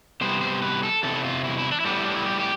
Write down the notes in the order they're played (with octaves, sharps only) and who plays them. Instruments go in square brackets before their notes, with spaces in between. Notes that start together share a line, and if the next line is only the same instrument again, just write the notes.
[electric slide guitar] C3 G3 B3 C5
C5
B4
A4
E2 C3 A4
E4
F4
E4
E4
D4
E4
A2 G3 B3 D4
E4
D4
E4
G4
G4